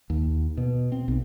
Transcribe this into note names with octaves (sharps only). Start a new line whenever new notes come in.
D#2
B2
C4
B1